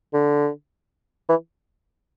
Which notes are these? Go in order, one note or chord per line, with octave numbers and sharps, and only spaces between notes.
D3
E3